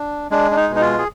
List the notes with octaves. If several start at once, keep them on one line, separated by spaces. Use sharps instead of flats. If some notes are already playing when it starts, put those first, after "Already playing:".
Already playing: D4
G#3 D4
D4
D#4
B2
D#4
F4
G#4